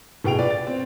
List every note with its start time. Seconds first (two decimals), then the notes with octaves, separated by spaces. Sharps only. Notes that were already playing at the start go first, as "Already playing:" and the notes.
0.24 D1 B2 G#4 G5 D7 F7
0.38 F4 B4 D5
0.50 A6
0.67 C4